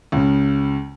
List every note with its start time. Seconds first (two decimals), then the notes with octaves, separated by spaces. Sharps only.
0.12 C#2 C#3